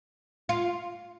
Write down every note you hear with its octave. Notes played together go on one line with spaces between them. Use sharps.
F4